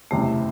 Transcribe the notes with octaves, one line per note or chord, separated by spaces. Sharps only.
F#1 E2 C3 E3 G3 A3